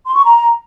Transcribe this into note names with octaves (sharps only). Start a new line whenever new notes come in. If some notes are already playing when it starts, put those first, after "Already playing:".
C6
C#6
A#5